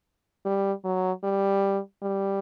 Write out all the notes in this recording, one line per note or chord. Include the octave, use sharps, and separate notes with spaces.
G3
F#3
G3
G3